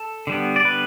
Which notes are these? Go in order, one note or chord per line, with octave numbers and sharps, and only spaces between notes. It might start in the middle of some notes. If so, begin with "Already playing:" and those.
Already playing: A4
D3 G3 B3
D5
D3 G3 B3 B4